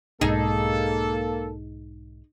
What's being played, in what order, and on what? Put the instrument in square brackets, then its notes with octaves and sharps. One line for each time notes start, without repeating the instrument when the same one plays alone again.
[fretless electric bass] B1 G#2 [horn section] A#3 A4 [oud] D#4 G#4